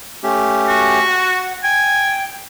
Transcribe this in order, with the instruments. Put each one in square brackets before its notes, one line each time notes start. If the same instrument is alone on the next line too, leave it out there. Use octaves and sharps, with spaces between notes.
[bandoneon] A3 C#4 G4
[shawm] F#4
[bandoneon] F#5
[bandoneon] G5 [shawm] G#5